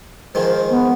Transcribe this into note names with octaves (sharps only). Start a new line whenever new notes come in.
G#2 D#3 F3 C5
B3